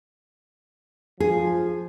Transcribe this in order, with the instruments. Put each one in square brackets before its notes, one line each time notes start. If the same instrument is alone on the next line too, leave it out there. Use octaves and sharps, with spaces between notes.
[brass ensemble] F3 [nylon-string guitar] G#4